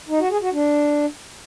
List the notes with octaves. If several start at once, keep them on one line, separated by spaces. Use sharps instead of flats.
D#4
F#4
G#4
F#4
D4